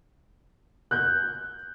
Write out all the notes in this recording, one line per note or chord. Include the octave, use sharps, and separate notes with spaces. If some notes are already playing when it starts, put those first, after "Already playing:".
F#6 G6